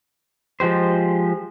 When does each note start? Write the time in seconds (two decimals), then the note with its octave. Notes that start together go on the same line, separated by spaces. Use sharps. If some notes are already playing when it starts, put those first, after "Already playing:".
0.60 F3 G#3 G4 C5